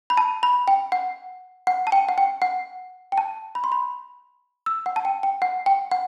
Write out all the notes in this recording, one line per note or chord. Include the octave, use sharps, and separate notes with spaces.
B5
A5
B5
G5
F#5
F#5
A5
G5
F#5
G5
F#5
G5
A5
B5
C6
B5
E6
F#5
A5
G5
G5
F#5
G5
F#5